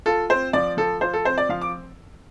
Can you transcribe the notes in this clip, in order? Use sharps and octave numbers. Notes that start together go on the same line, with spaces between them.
F4 A4
C4 C5
F3 D5
F3 A4
F4 C5
A4
C4 C5
D5
F3 F5
D6